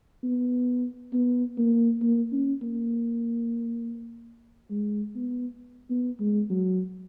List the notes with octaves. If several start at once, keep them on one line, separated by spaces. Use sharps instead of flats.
B3
B3
A#3
A#3
C#4
A#3
G#3
B3
B3
G#3
F#3